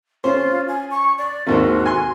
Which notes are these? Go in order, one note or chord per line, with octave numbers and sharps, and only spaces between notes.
C#4 F4 C5
G#5
C#6
D5
G#1 D#2 F#4 C5
G#5 C6